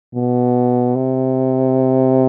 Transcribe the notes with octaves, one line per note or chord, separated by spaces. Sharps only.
B2
C3